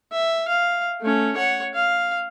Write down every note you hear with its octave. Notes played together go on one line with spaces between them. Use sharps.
E5
F5
A3 C#4
C#5 F#5
F5